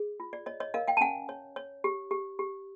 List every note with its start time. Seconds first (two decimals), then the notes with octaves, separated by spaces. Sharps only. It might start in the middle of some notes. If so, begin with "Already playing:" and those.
Already playing: G#4
0.20 F4
0.33 D5
0.46 C#5 D#5
0.60 C#5 D#5
0.74 A#4 D#5 F5
0.88 F5 G5
0.97 A5
1.01 C#4 F#5 G#5
1.29 C#5
1.56 C#5
1.84 G4
2.11 G4
2.39 G4